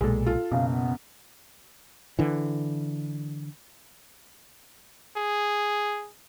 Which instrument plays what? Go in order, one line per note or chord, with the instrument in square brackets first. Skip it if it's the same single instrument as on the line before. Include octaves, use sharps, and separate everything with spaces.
[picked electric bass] B1 A#2 [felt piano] G#3 A4
[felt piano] F4 A4
[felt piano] F#1 [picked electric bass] B2 [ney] F5
[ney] B3
[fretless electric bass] D3 E3
[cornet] G#4